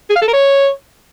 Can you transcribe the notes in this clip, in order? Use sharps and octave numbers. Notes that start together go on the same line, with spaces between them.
G#4
F5
A4
A#4
C#5